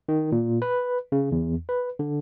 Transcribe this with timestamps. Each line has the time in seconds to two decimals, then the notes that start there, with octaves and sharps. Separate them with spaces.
0.09 D#3
0.32 A#2
0.62 B4
1.12 C#3
1.32 E2
1.69 B4
1.99 D3